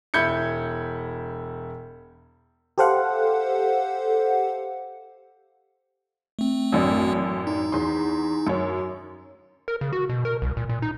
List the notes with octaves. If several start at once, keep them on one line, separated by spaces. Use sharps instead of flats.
E1 E4 B5 G6 G#6 C#7
G4 A4 C5 F5 F#5
A3 C4
A1 F#2 D4
D#4
E2 C6
F#2 C#5
A#4
C#3
F#4
B2
A#4
C2
A#2
A#2
D#4